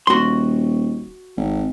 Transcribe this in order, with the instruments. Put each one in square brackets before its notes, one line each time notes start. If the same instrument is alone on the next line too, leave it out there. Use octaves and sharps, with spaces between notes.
[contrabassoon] D#1 [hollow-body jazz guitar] F#4 C6
[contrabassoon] G#1